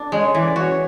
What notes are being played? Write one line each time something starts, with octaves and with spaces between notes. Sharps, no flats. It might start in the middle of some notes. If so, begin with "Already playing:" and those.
Already playing: D4
G#3 C#5
E3 D5
F#4 C#5